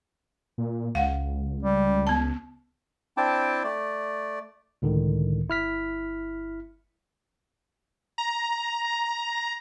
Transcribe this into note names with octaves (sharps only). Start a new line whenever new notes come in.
A#2
C#2 F5 F#5
G3
B3 A5
C4 D4 E4 G5 A5 D6
A3 D5
C#2 A2 D3 D#3
G1 E4 F6 B6
A#5